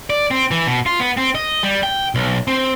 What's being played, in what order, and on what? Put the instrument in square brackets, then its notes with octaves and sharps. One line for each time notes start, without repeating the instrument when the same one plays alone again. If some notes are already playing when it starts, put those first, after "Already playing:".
[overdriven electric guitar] D5
C4
E3
B2
F4
B3
C4
D#5
G3
G5
B1
C4